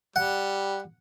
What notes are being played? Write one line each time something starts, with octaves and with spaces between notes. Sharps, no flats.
G3 F#5